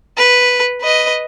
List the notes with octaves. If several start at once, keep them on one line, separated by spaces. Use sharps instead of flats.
B4
B4 D#5